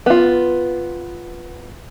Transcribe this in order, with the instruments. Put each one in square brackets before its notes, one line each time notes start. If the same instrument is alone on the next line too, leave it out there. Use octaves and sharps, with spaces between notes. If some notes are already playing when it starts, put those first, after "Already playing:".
[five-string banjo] B3 F4